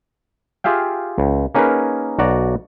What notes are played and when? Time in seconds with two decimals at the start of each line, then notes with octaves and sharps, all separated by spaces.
0.64 F4 G4 G#4 E5 F5 G5
1.18 C#2
1.55 A#3 C#4 D#4 G#4 A#4 B4
2.19 B1 F#4 D5 A#5